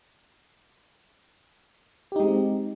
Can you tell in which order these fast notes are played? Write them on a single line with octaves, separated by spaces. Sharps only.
G4 D#4 G#3 C4